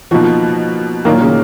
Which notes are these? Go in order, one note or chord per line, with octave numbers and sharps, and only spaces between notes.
B2 F3 A#3 D#4 F#4
A#2 D#3 F#3 A#3
C#3